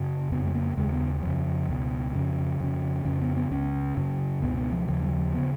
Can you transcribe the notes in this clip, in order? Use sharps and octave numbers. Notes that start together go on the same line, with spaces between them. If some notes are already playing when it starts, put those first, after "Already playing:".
Already playing: F#2 C#3 C#4
F2 C#3 B3
G#3
A#3
D#2 C#3 G#3
B3
F2 C#3
C#2 B2
F2 C#3
F2 C#3
F2 C#3 C#4
B3
B3
C#2 C#3 C#4
F#2 C#3
C#2 B2 B3
B3
F3
D#2 C#3 F3
F#3
F3
C#3 B3